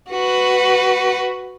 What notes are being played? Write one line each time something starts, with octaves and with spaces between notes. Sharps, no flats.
F#4 B4